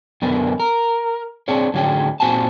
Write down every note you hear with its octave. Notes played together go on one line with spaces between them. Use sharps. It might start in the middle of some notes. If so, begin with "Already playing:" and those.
F#2 D3 B3 A#4
A#4
C4 D4 G#4 C#5
A2 D3 F#3 C#4 G#4 G5
A#2 C4 F#4 G#5 A5